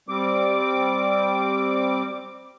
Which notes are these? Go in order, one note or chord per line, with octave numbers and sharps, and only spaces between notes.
G3 C4 D6